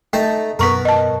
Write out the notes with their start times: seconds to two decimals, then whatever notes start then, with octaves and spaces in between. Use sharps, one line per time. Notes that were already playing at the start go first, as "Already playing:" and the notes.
0.13 A3 D#4 G5 A5
0.59 F#2 B2 B3 A#4 A#5 C#6 B6
0.85 D#5 A5